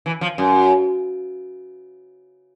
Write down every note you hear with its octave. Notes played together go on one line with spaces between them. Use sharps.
E3
F3
F#2